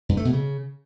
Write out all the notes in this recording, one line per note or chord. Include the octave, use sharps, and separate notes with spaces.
G2
A3
B2
C#3